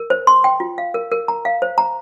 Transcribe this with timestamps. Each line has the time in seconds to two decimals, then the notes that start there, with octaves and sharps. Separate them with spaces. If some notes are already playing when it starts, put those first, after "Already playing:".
Already playing: A#4
0.10 C5
0.27 C6
0.44 G5
0.60 F4
0.78 F5
0.94 A#4
1.11 A#4
1.28 A#5
1.45 F5
1.62 C5
1.78 A#5